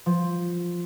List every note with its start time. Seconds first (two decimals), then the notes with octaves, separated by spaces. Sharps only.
0.06 F3